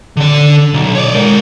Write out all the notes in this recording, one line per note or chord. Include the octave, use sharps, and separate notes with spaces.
D3 D5
B1
C#5 D5
G#3 A#4